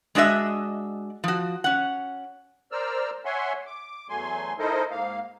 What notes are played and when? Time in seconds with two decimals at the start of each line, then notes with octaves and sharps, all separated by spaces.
0.15 G#3 D4 F#4 D#5 E5
1.24 F3 F#4
1.64 C#4 F#5
2.72 A#4 C5 D5 E6 F6
3.25 C#5 E5 F#5 G#5 C6
3.66 D6
4.09 E2 F#3 A3 G#5 C6
4.59 D#4 E4 A4 A#4 C5 D#5
4.91 G#2 A#3 F5